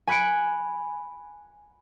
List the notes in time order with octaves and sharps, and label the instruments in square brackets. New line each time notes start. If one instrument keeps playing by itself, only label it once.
[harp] G#5 B5 F#6 C#7 D7